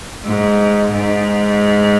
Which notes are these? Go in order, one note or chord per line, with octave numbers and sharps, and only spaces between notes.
G#2
G#2